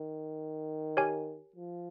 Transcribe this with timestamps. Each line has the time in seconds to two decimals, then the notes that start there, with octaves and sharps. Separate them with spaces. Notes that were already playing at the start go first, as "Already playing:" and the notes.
Already playing: D#3
0.97 G4 A#4 C#5 G#5
1.56 F3